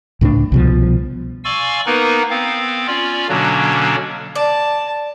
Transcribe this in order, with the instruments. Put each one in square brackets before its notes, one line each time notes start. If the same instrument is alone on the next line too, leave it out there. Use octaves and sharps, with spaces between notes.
[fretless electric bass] C#2 A2 G3 D4
C2 B2 F3
[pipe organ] D5 F5 G#5 C6 C#6 E6
A#3 B3 D#4 A#4 B4
B3 C4 F5
C#4 F4 D5
B2 D3 F#3 A#3 C#4 D4
[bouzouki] D5 [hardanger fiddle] A5